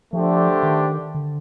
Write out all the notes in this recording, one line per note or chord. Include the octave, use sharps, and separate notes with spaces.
D3 F3 A3 D4 G4 C5
D#3
D3